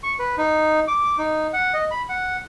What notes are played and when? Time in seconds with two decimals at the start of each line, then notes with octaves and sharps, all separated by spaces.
0.03 C#6
0.19 B4
0.38 D#4
0.88 D6
1.18 D#4
1.53 F#5
1.74 D#5
1.91 B5
2.09 F#5